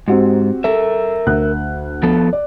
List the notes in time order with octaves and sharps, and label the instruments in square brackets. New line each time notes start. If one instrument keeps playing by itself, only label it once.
[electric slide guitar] G#2 [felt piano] C4 F#4 G4
[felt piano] A4 [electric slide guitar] A#4 E5
[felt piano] D2 F#6
[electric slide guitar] F3 B3 A4
[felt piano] D5